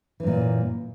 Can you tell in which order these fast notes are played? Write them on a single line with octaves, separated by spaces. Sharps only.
E3 F#2 A#2